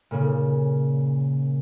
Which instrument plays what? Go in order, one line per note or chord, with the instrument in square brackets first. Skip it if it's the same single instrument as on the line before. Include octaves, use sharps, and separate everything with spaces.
[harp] A#2 C#3